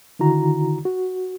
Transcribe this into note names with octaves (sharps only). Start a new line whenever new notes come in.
D3 D#3 E4 F#4 A#5
F#4